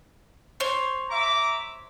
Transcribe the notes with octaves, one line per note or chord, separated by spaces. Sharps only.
C5 C#5
E5 A#5 D6